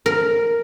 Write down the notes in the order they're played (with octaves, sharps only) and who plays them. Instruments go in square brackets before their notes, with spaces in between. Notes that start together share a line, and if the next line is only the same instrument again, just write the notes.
[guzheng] A#4